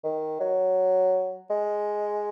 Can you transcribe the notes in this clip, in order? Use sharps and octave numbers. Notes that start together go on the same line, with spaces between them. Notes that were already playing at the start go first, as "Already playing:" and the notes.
D#3
F#3
G#3